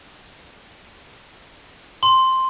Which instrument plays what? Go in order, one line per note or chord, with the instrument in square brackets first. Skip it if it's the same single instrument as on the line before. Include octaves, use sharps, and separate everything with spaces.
[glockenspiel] C6